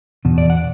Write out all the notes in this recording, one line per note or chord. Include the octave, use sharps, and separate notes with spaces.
E2 B2
D5
F#5